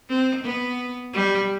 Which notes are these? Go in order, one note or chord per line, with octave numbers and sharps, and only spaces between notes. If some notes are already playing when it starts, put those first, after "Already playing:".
C4
B3
G3